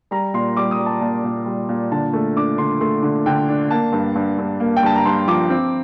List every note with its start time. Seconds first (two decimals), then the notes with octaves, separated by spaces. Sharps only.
0.11 G3 A#5
0.34 A#2 C6
0.57 G3 D6
0.71 D#6
0.78 G3
0.86 A5
1.01 A#2 A5
1.24 A#2
1.46 G3
1.69 A#2
1.91 D3 A5
2.13 A3
2.37 D4 D6
2.58 D3 C6
2.81 A3 C6
3.03 D3
3.26 D3 G5
3.48 D4
3.71 A#3 A5
3.93 G2
4.15 G2
4.38 G2
4.60 A#3
4.77 G5
4.83 G2 A5
4.95 A#5
5.05 G2 C6
5.28 F3 D6
5.50 C4